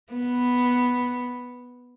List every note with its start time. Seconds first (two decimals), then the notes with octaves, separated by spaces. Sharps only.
0.13 B3